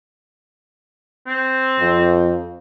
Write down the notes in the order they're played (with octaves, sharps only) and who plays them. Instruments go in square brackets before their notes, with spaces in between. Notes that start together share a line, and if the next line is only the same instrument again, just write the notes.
[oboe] C4
[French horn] F2